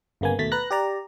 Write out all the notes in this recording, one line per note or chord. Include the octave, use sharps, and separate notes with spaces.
G1 C#3 A#3 B3 G#5
D#2 B2 A3 A6 B6
B4 A#5 F#6 A#6
G4 D5 A#5